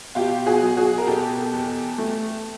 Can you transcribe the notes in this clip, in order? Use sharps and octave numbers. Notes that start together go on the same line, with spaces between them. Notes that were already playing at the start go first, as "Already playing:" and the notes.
B2 F4 G4
F#4 G#4
F#3
F#4 G#4
A#4
B2 G4 A4
E2
A3